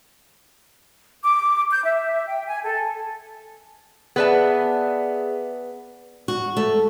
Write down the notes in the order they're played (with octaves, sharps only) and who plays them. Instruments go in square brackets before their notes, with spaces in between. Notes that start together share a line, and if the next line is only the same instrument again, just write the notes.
[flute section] D6
G6
E5
G5
G#5
A4
[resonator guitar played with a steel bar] B3 B4 A5 [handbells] G#4 D5 E5
[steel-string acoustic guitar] F#4
A3